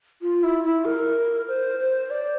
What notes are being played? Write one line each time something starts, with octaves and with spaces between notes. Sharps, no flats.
F4
E4
E4
A#4
C5
C5
D5